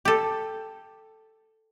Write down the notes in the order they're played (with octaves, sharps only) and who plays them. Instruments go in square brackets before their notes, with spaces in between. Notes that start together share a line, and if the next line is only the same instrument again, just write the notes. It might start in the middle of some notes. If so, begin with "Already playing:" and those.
[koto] G4 A4